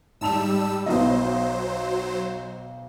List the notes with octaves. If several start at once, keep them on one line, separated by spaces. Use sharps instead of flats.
G#2 G3 A5 E6 F7
B1 F#3 B3 C5 D#5